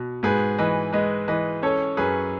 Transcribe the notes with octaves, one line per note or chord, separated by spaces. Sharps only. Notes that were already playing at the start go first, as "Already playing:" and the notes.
Already playing: B2
G#2 G#4 B4
E3 B4 D#5
G#3 B4 D#5
E3 B4 D#5
C#4 A4 C#5
F#2 G#4 B4